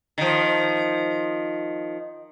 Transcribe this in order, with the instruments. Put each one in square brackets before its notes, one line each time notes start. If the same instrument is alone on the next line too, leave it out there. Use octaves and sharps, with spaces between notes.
[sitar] D#3 F3